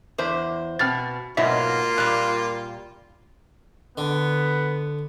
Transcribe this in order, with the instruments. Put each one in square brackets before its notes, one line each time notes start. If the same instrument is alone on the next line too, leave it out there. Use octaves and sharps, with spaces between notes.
[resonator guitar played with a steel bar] E2 C5
[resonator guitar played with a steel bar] B2 [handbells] C4 F6 A6
[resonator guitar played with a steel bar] G#2 B2 F#3 [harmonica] A#3 F4 [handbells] E5
[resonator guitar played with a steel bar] A#2 G3 [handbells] F#6
[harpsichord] D3 [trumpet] B3